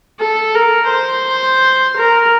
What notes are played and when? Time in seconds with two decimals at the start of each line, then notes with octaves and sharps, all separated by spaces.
0.20 A4
0.55 A#4
0.90 C5
1.97 A#4